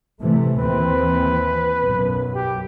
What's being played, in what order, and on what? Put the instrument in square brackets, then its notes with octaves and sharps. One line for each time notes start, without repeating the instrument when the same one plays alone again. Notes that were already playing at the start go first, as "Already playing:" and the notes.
[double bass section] C3 E3 A3
[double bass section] D#2 E3 C4 [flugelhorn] B4
[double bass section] B1 F#2
[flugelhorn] G4